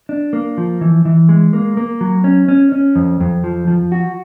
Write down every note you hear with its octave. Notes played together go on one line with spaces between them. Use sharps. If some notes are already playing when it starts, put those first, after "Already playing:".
D4
A#3
F3
E3
E3
G#3
A#3
A#3
F#3
C#4
C#4
C#4
F2
F2
F3
F3
F#4